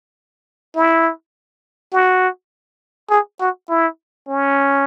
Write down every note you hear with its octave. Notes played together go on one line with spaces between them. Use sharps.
E4
F#4
G#4
F#4
E4
C#4